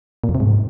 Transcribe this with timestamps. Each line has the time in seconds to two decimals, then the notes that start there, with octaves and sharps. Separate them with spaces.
0.24 A#2
0.29 F2
0.35 C3
0.40 G#2